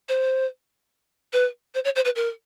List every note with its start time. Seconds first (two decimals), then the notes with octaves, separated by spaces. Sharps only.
0.09 C5
1.33 B4
1.75 C5
1.84 C#5
1.96 C5
2.05 B4
2.16 A#4